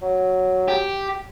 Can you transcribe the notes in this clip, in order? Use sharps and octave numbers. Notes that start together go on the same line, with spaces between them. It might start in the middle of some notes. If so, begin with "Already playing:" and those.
F#3
G4